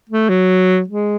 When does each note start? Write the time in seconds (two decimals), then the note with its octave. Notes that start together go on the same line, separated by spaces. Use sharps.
0.09 A3
0.29 F#3
0.88 G#3